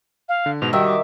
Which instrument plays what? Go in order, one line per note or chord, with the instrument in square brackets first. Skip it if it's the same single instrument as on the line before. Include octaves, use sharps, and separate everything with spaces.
[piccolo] F5
[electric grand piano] D3
[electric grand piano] G#2 B2 [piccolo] F7
[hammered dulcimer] D#3 E5 [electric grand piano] G3 F#4 [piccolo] G5
[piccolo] D6